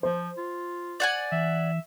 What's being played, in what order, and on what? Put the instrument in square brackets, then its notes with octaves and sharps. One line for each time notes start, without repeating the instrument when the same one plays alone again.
[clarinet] F3 [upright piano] C5
[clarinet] F4
[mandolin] D5 F#5 G#5
[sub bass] E3 [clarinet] E5